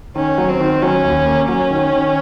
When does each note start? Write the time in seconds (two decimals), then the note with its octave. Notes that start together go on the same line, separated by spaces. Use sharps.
0.16 D#3 C#4
0.38 F#3
0.49 C4
0.60 D#3
0.82 F#3 C#4
1.05 D#2
1.26 A#3
1.48 F#3 C#4
1.71 D#3
1.93 D#3